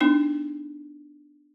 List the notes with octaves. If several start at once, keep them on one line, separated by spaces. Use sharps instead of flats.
B3 D4 D#4